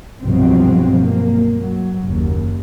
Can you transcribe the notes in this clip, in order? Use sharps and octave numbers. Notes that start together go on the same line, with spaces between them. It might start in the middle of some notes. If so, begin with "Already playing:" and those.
C2 G2 B2 F3 F#3 C4
A#3
F#3
F#1 D#2